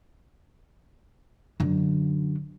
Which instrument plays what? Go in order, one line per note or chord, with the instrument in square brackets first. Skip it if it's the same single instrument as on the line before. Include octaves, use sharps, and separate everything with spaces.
[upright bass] F#2 D3